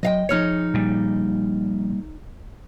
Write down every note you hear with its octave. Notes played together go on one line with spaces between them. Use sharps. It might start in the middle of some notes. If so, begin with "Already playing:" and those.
F#3 D#5 F5 G5
F3 D#4 G#4 C#5 F6 C#7
A#2 G3